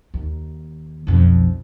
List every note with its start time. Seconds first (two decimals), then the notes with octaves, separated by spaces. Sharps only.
0.14 D#2
1.07 B1 F2